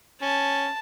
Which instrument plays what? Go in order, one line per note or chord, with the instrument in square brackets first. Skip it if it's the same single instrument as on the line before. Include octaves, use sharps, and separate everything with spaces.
[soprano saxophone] C#4 [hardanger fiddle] A5